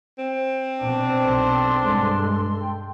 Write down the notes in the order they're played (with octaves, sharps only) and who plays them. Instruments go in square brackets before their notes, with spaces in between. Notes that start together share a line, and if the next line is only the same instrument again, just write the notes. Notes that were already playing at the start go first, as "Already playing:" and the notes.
[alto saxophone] C4
[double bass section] B2 [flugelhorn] D4
[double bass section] B1 [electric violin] A4 C6
[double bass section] G2 G#3
[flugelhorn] G5